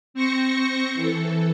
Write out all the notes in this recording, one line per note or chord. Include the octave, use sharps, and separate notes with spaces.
C4 C5 C#6 A#6 C#7
E3 A4